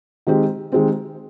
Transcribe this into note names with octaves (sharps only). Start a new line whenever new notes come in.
D#3 G#3 C4 G4
D#3 G#3 C4 G4